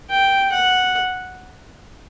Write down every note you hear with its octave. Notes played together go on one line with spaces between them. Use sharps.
G5
F#5